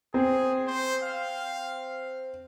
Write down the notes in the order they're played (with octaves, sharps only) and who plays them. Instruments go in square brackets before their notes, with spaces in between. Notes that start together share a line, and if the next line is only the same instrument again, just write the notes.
[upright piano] C4 [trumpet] G#4
[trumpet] C5
F5